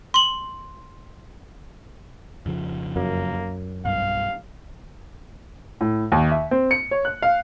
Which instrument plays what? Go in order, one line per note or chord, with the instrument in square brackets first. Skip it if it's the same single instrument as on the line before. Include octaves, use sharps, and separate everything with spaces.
[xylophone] C6 F#7
[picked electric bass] F2 C#3 F3
[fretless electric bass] F#2 [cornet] A#3
[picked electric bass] B1 G2 [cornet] F5
[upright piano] A2
D#2
E5
C4
C#7
C#5
F#6
F5